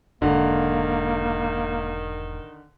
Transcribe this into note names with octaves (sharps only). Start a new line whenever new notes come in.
E1 G#2 D3 D#3 A#3